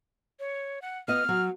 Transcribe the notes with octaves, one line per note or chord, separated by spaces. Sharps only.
C#5
F#5
B3 F4 D#5 F6
F#3